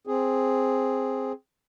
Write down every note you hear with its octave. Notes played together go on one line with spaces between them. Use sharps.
C4 G#4